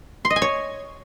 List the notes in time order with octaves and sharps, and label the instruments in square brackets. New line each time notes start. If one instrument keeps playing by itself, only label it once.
[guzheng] C6
D#5
G#5
C#5